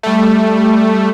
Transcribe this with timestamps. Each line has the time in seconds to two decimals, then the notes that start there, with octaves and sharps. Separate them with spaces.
0.03 G3 A3